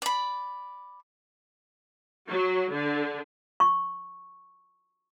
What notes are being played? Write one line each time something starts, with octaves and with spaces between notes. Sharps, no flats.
D5 B5
F#3
D3
C#6